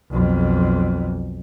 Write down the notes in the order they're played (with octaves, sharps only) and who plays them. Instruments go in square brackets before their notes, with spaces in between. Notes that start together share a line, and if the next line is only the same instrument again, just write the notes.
[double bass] B1 F2